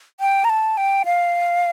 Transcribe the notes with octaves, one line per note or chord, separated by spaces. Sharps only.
G5
A#5
A5
G5
F5